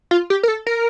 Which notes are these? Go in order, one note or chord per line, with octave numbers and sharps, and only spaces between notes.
F4
G4
A#4
A4
A#4